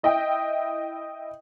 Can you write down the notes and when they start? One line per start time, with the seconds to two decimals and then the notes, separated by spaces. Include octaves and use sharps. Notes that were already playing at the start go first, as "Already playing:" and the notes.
0.03 E4 D#5 E5 G5